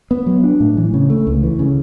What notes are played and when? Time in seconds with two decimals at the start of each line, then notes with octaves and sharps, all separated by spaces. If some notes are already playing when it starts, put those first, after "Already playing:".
0.11 B3
0.27 F#3
0.44 D4
0.60 A2
0.77 E3
0.94 C#3
1.10 A3
1.27 C#2
1.43 E3
1.59 C#3